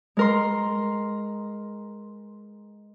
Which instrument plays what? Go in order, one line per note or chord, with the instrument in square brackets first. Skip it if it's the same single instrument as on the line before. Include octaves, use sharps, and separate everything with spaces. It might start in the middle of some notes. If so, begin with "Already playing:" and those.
[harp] G#3 A#4 C6